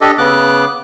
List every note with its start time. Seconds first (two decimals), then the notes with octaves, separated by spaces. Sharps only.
0.01 D4 G4 A4 D#5
0.18 C#3 B3 D6 F#6